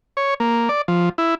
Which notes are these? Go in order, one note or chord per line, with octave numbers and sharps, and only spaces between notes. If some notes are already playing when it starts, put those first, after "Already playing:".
C#5
A#3
D5
F3
E4